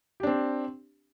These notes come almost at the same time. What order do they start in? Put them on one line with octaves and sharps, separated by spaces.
G4 D4 C4